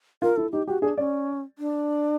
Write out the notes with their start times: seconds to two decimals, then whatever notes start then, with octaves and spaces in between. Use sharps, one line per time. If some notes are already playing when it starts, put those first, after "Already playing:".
0.22 F4 A#4
0.36 E4 A4
0.52 D#4 G4
0.67 F#4 G4
0.82 D4 G#4
0.97 C#4 D5
1.59 D4